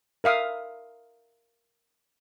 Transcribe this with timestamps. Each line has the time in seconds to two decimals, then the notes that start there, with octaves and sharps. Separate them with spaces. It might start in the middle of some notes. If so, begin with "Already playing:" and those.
0.24 A#4 E5 F5 D#6